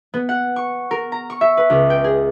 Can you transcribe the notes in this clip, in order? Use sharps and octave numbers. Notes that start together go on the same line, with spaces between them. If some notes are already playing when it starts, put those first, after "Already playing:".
B3
F#5
C#6
A#4
A#5
C#6
E5
B4
C#2
G5
G#4